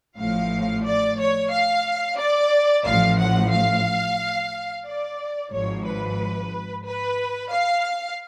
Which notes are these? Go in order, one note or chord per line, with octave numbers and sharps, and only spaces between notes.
A1 A2 F3 F5
D5
C#5
F5
D5
A1 A2 F3 F5
F#5
F5
D5
G#1 G#2 F3 C#5
B4
B4
F5